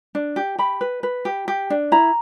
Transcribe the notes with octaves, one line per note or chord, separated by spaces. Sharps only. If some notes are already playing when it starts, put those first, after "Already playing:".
D4
G4
G4 B5
B4
B4
G4
G4
D4
E4 A#5